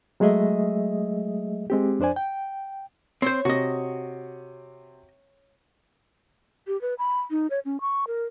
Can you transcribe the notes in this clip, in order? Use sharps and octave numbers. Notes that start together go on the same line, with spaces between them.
F#3 G#3 A3 G#4 D#5 E5
G#3 C4 G4
F2 D4 C5 D5 G#5
G5
C4 C5 C#5
C3 F#4 D#5
G4
B4
B5
D#4
C#5
C#4
C#6
A#4